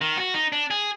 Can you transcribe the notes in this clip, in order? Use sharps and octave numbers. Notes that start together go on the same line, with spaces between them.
D#3
F#4
D#4
D4
G#4